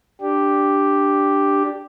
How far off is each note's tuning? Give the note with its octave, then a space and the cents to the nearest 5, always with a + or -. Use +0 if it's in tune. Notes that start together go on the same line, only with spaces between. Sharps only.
D4 +0 G4 +0